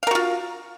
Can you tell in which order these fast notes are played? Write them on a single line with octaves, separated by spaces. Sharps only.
F5 A#4 F#4 F4